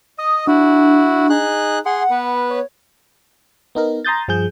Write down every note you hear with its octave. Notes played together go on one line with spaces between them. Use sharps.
D#5 D#6
D4 E4 F#4
D#4 G#4 F#6
G#4 F#5 C6
B3 B4
C#5
B3 D#4 A#4
A#5 C6 D#6 G6 A6
G2 F3 G#4 G6